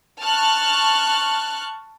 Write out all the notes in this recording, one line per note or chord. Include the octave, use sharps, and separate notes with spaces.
A5 C#6 F6 F#6